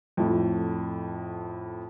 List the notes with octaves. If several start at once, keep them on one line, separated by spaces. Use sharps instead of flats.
F2 A2